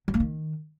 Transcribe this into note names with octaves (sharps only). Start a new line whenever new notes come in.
F#3
A#3
D#3